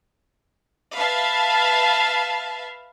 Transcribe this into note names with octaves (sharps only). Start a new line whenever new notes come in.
B4 E5 F5 A5